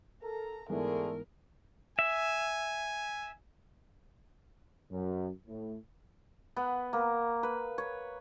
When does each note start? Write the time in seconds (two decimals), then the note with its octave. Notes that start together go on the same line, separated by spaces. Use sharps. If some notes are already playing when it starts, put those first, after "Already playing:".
0.23 A4 A#4 A#5
0.69 G#2 D3 E3 A3 B3 G#4 A#4
1.99 E5 G#5
4.91 F#2
5.47 A2
6.56 B3
6.93 A#3
7.43 B4
7.78 C#5